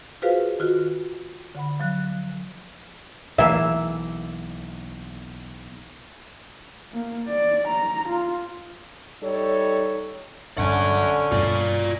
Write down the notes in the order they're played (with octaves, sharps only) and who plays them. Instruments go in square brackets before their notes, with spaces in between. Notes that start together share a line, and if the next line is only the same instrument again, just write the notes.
[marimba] F4 F#4 G#4 B4 C5 F5
D#3 F4 F#4
D3 F#5 B5
F3 F#3 F#6
[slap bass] B1 [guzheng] E3 A#3 [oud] E5
[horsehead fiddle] A#3
D5
A#5
F4
[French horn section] G3 D#4 A4 C#5
[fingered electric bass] A#1 G2 [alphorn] D3 [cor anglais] C#4 [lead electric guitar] F#5 G#5
[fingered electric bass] A#1 G2 B2 [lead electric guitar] F4 D5